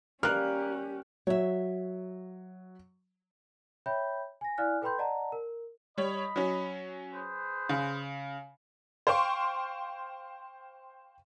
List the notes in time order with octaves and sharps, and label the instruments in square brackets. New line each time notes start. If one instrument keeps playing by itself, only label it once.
[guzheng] G3 A#3 [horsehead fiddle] C#4 G4 [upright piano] A#4 [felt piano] F6 F#6
[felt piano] F#3 [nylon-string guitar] C#5 E5
[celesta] C#5 E5 G5 B5 G6
G#5 A#6
E4 D5 F5 G#5 F6 F#6
A4 B4 G5 B5 C6 G6
D5 D#5 F#5 A5 A#5
A#4
[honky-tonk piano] G3 C#5 [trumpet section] D#5 B5
[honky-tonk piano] F#3 C#4
[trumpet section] G#4 B4 C5
[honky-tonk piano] C#3
C5 F5 G5 C6 C#6